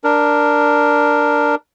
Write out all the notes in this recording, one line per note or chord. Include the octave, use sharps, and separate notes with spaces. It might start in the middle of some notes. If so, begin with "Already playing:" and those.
D4 A#4